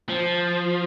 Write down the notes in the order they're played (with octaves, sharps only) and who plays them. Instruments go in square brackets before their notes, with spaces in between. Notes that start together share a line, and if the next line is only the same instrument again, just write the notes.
[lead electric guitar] F3